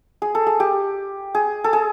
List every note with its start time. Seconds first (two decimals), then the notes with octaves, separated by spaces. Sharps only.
0.22 G#4
0.35 A4
0.47 G#4
0.60 G4
1.35 G#4
1.64 A4
1.73 G#4